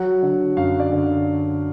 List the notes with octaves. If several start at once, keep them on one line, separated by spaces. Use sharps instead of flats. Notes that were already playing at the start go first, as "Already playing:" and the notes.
Already playing: F#3 F#5
D3
F#2 F5
D5
D3